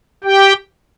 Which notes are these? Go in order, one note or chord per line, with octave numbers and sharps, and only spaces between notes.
G4 G5